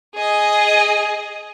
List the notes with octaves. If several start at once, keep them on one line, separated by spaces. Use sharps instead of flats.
G#4 D#5